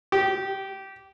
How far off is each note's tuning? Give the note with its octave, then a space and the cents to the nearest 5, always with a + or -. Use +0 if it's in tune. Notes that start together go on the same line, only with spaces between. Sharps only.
G4 -15